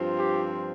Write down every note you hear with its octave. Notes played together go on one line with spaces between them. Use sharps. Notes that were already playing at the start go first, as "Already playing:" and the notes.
Already playing: G2 F3 C4 F4
G4